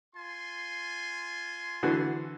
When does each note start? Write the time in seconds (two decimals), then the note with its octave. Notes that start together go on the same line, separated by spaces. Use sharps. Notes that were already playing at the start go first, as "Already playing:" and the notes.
0.14 F4 G#5 C6
1.83 D3 E3 F#4